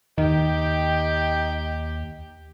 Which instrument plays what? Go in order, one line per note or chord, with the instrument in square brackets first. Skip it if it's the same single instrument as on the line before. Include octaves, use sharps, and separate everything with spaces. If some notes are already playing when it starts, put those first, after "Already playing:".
[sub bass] D#2 [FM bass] D#3 [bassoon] D#4 [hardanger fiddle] G4 G5